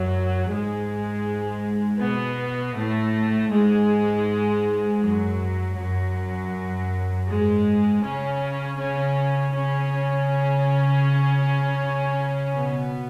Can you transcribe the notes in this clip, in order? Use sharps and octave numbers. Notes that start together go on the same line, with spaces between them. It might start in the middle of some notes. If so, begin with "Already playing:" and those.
Already playing: F#2 F#3
G#2 G#3
B2 B3
A2 A3
G#2 G#3
F#2 F#3
F#2 F#3
G#2 G#3
C#3 C#4
C#3 C#4
C#3 C#4
B2 B3